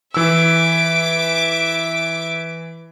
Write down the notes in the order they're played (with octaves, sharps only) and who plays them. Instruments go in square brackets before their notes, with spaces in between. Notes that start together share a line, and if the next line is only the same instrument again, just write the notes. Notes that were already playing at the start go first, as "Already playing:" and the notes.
[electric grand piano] E3 E6 [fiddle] E5 D6